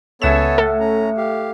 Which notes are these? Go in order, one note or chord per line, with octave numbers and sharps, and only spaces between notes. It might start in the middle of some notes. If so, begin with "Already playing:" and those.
C#2 B3 A4 C#5 E5 F#5 G#5 E7
A2 A4
C#4 A#5
G4 F5